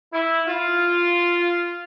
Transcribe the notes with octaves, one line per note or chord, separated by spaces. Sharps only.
E4
F4